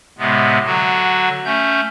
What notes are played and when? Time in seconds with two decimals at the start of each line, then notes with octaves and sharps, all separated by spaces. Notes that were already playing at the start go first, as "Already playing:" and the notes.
0.18 A2 C3 G#3 B3
0.65 D3 F#3 F#4
1.45 A3 C#4 G6